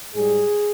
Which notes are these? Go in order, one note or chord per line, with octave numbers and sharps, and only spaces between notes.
G#2 G3 G#4